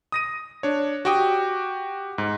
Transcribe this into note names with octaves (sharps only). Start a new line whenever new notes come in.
D#6 A#6 D#7
D4 C#5
F#4 G4 G5 D6 D#6
G#2